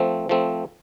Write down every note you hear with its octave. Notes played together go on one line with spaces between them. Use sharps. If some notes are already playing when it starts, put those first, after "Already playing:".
Already playing: F3 A3 C4
F3 A3 C4